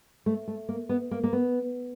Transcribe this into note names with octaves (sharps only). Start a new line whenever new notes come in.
A3
A3
A#3
B3
A#3
A#3
B3